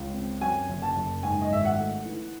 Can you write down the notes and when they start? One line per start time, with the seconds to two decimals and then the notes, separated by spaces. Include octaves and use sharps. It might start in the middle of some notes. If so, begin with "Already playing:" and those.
Already playing: C#2
0.13 C4
0.41 F#2 G#5
0.68 F#1
0.82 A5
0.96 F#1
1.23 G#2 G#5
1.41 D#5
1.51 G#1 E5
1.65 F#5
1.78 A3
2.05 E3